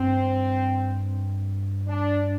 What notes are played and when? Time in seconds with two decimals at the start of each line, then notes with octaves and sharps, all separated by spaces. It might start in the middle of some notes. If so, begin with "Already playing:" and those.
Already playing: G2 C4
1.87 D4